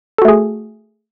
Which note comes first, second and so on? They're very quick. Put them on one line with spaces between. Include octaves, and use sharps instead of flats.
A4 F#4 A3 G#4